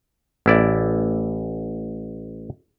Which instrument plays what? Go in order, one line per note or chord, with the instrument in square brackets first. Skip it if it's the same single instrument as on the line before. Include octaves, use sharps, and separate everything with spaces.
[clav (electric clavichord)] A1 E4 D5